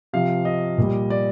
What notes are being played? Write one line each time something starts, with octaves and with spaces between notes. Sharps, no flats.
C3 F3 F5
D#5
A#2 G3
D5